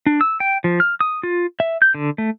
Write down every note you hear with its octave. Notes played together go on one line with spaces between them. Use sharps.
D4
E6
G5
F3
F6
D#6
F4
E5
G6
D3
A3